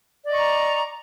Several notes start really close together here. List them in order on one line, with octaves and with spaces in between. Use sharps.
D5 D#5 C#6 A#5